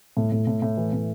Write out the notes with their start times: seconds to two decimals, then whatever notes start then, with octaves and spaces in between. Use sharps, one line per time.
0.17 A2
0.32 A2
0.47 A2
0.62 A2
0.77 E3
0.93 A2